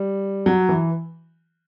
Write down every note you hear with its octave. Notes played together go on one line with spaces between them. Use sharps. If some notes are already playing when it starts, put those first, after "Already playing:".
Already playing: G3
F#3
E3